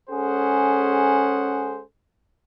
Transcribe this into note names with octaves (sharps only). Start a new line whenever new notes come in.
G#3 C#4 G#4 A4 C5 F#5